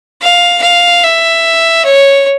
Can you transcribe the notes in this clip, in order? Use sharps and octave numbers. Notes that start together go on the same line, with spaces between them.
F5
F5
E5
C#5